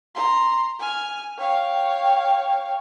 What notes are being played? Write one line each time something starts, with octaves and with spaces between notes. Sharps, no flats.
A#5 C6
G#5 F6
C#5 F5 G5